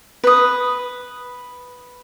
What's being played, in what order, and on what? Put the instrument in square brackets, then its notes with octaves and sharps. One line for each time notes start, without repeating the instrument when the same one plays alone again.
[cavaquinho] B4 D#6